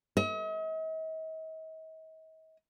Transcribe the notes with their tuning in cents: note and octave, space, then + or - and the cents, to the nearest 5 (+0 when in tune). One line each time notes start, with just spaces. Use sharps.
D#5 +45